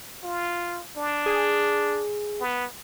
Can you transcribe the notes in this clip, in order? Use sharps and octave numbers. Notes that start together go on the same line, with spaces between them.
F4
D4
G#4
B3